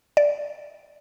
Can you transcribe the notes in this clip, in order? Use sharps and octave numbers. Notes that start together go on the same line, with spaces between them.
D5